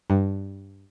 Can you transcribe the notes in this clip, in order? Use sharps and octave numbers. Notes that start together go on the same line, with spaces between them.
G2